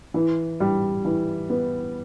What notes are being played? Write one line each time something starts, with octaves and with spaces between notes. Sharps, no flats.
E3
G3
E3
B3